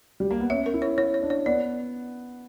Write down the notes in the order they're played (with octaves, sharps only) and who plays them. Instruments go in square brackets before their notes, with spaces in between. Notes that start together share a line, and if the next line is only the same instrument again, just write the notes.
[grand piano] G3
A#3
B3
[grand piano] C#4 [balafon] E5
[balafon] A#4
[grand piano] E4
[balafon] C#5
[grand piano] E4 [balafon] C#5
[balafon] C#5
[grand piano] D4
[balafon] C#5
[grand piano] B3 [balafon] D5